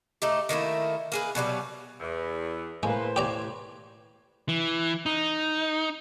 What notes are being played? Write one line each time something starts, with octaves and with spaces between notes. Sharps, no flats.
A3 D#4 G4
D#3 A3 A#3 E4
A#3 G#4 B4
B2 F#3 G3 B4
E2
A2 G#3 A#3 B4 C5
G4 B4 C#5 D5 A#5
E3
D#4